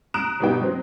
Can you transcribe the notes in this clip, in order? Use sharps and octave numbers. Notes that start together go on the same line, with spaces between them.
A#5 D#6 F#6 D7 E7
G1 B2 G3 B3 D#4 G5
F#3 C4